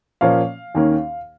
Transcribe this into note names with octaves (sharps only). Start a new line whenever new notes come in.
A#2 F3 A#3 C#4 F5
D#2 D#3 A#3 C#4